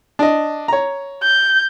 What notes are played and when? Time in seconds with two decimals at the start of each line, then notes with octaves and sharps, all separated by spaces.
0.19 D4 D#5
0.68 C#5 A#5
1.23 G6